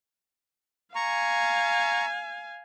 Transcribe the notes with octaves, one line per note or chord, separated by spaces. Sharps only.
F5 G#5 A#5 C#6